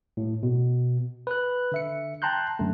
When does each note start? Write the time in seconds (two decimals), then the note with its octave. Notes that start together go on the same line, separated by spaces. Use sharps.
0.17 A2
0.43 B2
1.27 B4 F#6
1.72 D3 E5 C#7
2.22 G5 A5 A#5 C6 F#6 G6
2.59 F#2 D3 A3